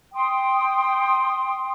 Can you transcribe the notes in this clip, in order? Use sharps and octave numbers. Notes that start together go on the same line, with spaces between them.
G5 C6 D#6